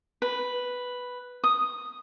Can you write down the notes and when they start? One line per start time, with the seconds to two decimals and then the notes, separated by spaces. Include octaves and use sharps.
0.22 B4
1.44 D#6